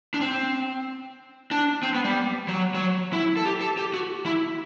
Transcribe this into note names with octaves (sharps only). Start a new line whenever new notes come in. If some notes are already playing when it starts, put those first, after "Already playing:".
D4
C4
D4
C4
B3
G3
F#3
F#3
E4
A4
G4
A4
G4
F#4
E4